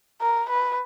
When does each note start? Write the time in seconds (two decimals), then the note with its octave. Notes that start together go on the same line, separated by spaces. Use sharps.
0.21 A#4
0.49 B4